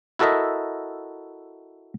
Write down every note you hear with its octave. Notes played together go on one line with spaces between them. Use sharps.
E4 F#4 A4 A#4 D#5 E5